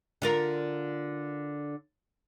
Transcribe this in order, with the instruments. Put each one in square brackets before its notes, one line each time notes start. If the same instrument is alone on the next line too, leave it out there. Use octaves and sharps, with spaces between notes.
[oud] D3 F4 A#4